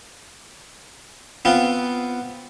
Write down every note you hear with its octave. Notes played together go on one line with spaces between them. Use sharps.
B3 C4 F4